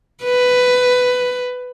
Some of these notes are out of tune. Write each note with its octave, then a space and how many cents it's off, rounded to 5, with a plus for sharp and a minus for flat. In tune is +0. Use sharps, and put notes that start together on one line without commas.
B4 +10